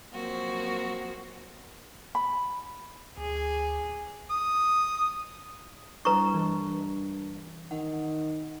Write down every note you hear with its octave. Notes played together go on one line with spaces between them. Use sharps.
F3 F#3 A#3 C4 F#4
B5
D2 G#4
D#6
G2 G3 E4 B4 A#5 C#6
E3
D#3 F#5